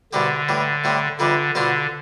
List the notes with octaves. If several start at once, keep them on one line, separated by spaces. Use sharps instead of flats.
C2 B2 D3 G3 C4 G4
A2 E3 G3
A2 G3 C4
F2 D3 E3 G3 D4
B2 D3 G3 C4 F4